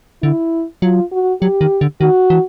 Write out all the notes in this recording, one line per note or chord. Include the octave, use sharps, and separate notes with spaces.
D3 E4
F#3 F4
F#4
F#3 G4
D#3
D3
D#3 F#4
E3